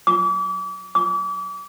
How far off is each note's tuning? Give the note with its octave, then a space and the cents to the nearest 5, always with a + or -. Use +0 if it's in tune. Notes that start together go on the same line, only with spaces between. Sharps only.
D6 -35
D6 -35